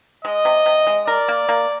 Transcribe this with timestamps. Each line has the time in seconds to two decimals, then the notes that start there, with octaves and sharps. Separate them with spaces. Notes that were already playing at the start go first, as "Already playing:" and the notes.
0.25 G#3 D#5
0.45 C3
0.66 C3
0.87 G#3
1.07 A#4 D5
1.28 A#3
1.49 A#3